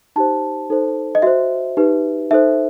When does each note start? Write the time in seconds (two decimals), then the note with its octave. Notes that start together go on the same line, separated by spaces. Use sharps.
0.16 D#4 G4 C5 A5
0.70 D#4 A4 C5
1.15 D#5
1.22 F#4 C5 E5
1.77 D#4 G4 B4
2.31 D#4 A4 C5 E5